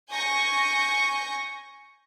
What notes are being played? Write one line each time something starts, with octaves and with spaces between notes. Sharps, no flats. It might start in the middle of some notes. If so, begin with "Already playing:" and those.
G#5 C#6 G6 A#6